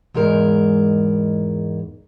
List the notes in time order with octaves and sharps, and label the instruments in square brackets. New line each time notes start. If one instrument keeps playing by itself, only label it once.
[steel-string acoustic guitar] E2 G#2 G#3 A#4